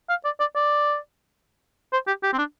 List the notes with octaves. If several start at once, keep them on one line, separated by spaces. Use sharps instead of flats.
F5
D5
D5
D5
C5
G4
G4
C4
D4